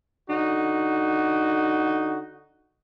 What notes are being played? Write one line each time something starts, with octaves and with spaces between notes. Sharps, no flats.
D3 D#4 F#4